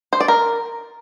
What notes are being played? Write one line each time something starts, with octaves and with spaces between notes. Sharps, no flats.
C5
D5
A#4